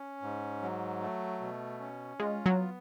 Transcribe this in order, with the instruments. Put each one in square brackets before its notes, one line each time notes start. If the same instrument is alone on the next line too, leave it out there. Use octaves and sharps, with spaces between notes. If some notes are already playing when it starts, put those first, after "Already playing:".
Already playing: [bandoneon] C#4
G#2
F#3
A3
B2
C#4
[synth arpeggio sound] G#3 [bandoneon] F4
[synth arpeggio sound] F#3
[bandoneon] B3